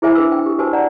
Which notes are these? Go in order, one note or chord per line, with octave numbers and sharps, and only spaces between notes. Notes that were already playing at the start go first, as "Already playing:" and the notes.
E4 G#4 C5 E5 G#5 B5
D4 G#4 B4 E6
G5
G4 A4
F#4 B4 C5 G#5 A5 E6
C#5 D5 F#5 A#5